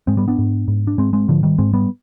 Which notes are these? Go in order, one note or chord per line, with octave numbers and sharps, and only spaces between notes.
G#2 G#3 C4
G3 B3
B3 D4
G#2
G#2
D4
G#2 G#3 C4
G#3 C4
G#2 D3 F3
D#3 G3
G#2 G#3 C4
G3 B3